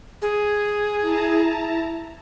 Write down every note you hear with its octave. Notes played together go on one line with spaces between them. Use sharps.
G#4
E4 A5 A#5